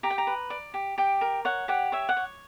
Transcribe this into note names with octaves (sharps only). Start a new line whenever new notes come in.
G4 A#5
G5
A#5
B4
D5
G4
G4 G5
A#4
C#5 F#5
G4 F#5
C#5 E5
F#5
C#5